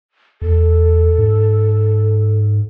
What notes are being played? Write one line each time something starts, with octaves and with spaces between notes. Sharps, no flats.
E2 A4
G#2